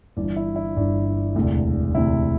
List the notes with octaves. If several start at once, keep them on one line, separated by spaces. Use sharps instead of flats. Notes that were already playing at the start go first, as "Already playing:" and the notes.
G1 G2 E3 D5
E4
E4
G1 G2 E3 D5
E1 D2 C3 E3
E1 D2 C3 E3 E4